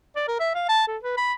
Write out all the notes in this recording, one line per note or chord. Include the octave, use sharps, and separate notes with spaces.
D5
A#4
E5
F5
A5
A4
B4
B5